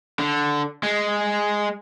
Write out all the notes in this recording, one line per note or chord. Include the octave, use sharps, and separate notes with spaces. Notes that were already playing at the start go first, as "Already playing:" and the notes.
D3
G#3